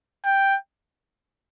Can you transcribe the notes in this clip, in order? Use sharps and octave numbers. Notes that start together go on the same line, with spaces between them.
G5